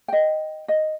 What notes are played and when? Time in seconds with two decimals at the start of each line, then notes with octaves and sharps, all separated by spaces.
0.08 D#5 G5
0.68 D#5